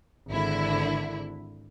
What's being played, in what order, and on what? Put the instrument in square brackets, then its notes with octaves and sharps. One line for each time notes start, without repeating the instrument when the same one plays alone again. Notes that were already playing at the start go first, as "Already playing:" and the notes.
[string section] G#1 D3 E4